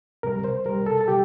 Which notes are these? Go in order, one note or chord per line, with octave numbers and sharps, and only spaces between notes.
C2 C3 G3 A#4
C5
C2 C3 G3 A#4
A4
A4
C3 G3 G4